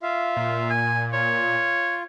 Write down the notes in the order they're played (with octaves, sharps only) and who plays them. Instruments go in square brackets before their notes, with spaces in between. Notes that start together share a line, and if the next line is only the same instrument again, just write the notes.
[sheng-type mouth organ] F4 E5 F5
[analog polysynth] A#2
[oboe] G#5
[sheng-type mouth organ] F4 [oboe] C#5